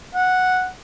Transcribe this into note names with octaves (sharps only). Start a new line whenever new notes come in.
F#5